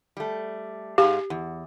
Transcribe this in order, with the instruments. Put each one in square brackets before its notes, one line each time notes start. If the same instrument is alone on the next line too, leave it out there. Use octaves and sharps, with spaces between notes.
[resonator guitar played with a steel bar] G3 A3
[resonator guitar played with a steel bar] G#2 G#4 F5 [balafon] G4
[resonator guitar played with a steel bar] E2